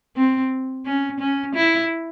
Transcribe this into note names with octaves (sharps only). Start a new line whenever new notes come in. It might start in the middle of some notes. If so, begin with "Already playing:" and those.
C4
C#4
C#4
E4